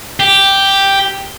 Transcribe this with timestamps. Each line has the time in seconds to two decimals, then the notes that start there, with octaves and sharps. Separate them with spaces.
0.20 G4